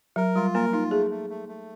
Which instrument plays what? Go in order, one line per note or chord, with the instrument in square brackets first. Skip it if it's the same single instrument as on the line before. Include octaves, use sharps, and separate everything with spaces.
[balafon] F#3 [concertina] A#4
[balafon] G3 [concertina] F4
[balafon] A#3 [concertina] A#4
[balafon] D#4 [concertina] F4
[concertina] A3 [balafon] G#4
[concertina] A3
A3
A3